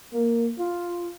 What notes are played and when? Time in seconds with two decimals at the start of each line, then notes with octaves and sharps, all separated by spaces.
0.13 A#3
0.59 F4